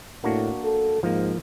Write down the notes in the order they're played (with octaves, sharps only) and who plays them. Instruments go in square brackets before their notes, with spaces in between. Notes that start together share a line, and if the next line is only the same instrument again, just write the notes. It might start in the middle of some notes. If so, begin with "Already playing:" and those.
[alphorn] A2 [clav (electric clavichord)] A#3 D4 F#4
[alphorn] A4
[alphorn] G#2 [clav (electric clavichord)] F3 A#3